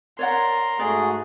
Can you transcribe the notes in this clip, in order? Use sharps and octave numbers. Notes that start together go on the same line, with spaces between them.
A#4 C#5 D5 F#5 C6
G#2 A3 F#4 G#4 D5